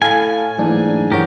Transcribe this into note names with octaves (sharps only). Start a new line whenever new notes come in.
A2 A4 F5 G#5
G#2 E3 F#3 A3 A#3 D4
G2 E3 G4 A#4 C#5 F#5